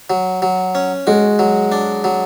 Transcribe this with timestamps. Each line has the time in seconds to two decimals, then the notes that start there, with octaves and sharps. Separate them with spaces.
0.10 F#3
0.42 F#3
0.75 C#4
1.07 G#3 F#4
1.39 F#3
1.72 D4
2.04 F#3